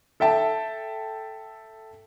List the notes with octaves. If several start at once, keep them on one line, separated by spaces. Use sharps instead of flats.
A4 E5 G5 A5